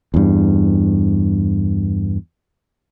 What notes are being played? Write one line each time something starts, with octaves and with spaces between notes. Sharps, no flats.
E2 G2